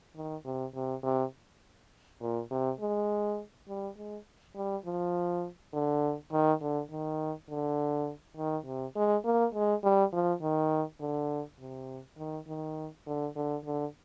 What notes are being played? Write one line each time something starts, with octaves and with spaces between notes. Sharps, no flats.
D#3
C3
C3
C3
A#2
C3
G#3
G3
G#3
G3
F3
D3
D#3
D3
D#3
D3
D#3
C3
G#3
A#3
G#3
G3
F3
D#3
D3
C3
D#3
D#3
D3
D3
D3